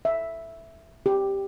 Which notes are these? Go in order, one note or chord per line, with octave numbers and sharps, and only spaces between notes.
E5
G4